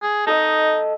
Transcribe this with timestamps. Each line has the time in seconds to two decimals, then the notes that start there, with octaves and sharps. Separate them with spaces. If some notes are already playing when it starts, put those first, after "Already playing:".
0.02 G#4
0.27 D#4 A4 D#5